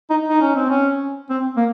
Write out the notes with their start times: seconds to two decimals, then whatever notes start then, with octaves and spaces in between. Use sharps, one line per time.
0.10 D#4
0.28 D#4
0.41 C#4
0.55 C4
0.69 C#4
1.30 C4
1.57 A#3